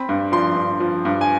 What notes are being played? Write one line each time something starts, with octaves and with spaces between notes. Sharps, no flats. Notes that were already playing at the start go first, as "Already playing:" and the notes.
Already playing: C4 B5
G2
F3 C6
G2
F3
G2
G#5